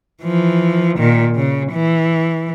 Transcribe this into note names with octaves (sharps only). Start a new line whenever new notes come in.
E3 F3
A#2 D#3
C#3
E3